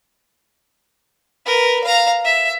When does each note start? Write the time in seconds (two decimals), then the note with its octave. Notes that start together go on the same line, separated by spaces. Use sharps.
1.46 A#4 B4
1.84 F5 A#5
2.25 E5